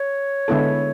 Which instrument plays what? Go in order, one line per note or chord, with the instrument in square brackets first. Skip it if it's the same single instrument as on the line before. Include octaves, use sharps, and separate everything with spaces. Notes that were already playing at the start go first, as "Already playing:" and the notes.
Already playing: [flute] C#5
[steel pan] D3 G#3 B3 E4 A4